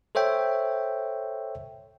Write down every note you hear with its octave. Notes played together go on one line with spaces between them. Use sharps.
A4 C5 C#5 E5 G5